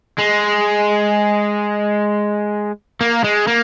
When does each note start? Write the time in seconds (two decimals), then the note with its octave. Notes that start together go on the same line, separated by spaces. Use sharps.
0.19 G#3
3.01 A#3
3.24 G#3
3.48 A#3